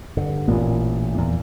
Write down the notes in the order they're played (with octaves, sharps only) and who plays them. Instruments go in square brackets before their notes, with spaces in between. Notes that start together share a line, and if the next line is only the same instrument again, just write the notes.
[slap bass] G2 D3
[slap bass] A1 [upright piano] A#2
[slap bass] E2